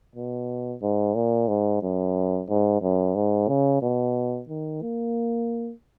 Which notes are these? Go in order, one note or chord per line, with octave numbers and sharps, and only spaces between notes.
B2
G#2
A#2
G#2
F#2
G#2
F#2
G#2
C#3
B2
D#3
A#3